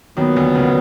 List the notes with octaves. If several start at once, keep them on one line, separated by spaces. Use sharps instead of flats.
D#2 A#2 D#3 F#3 B3
D2 D3
C#2 C#3